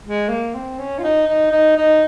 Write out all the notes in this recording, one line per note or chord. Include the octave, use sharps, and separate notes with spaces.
G#3
A#3
C4
C#4
F4
D#4
D#4
D#4
D#4